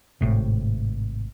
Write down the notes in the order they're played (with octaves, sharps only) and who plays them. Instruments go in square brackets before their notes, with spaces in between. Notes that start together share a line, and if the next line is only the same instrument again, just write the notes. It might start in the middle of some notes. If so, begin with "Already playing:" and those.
[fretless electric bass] G#1 A2 C3